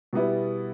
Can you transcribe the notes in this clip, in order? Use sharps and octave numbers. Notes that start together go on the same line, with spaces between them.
B2 G3 B3 E4